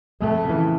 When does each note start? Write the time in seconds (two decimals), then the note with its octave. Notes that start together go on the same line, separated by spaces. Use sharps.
0.21 F2 A3
0.45 C#3 E3